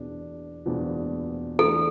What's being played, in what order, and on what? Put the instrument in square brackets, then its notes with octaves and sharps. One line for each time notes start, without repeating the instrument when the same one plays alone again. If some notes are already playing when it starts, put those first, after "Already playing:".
Already playing: [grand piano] E2 B2 B3 D4
E2 B2 B3 D4 F4
[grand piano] E3 A3 D4 [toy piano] A4